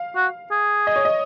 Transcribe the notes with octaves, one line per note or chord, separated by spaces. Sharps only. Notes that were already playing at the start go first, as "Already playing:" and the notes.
Already playing: F5
F#4
G#4
D#5
C#5
D#5